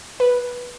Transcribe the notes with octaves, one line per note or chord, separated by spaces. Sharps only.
B4